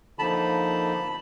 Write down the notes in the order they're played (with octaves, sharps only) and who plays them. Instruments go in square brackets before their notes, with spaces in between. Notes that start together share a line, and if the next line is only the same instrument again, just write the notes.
[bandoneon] D3 F3 A#3 D#4 A5 B5